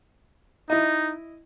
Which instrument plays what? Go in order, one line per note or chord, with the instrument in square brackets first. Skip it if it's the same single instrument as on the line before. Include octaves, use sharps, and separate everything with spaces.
[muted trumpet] D#4 [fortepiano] E4 D#5